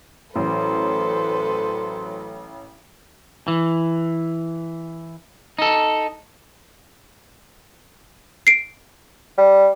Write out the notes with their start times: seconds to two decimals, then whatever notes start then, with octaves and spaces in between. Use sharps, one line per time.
0.36 A1 F#3 A4 B4 C5
3.48 E3
5.59 D#4 A4
8.47 C7 D7
9.38 G3